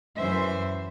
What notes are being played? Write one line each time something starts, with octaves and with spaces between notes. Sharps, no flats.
F#2 E3 C5 E5